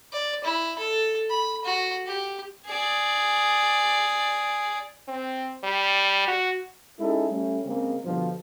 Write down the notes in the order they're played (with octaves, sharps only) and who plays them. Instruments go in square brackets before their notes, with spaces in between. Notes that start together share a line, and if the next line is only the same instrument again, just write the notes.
[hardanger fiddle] D5
E4
A4
B5
F#4
G4
G#4 D5
[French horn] C4
G3
F#4
[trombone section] G#3 C#4 D#4 E4 G4 A4
G3 A3 C#4
C#3 G#3 A#3 C4
G2 B2 D3 F3